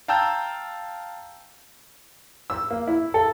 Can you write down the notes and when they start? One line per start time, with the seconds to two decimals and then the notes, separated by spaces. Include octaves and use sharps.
0.08 F5 G5 A5 A#5 E6 G6
2.50 E6
2.71 A#3
2.87 E4
3.14 A4